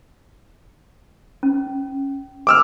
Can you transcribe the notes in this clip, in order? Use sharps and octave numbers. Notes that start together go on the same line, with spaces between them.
C#4
D6 E6 F6